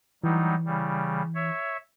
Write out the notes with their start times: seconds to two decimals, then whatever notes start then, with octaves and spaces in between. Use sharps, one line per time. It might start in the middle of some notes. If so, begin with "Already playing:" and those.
0.24 E3 F#3 G3 D#4
0.66 C#3 G3
1.35 C#5 E5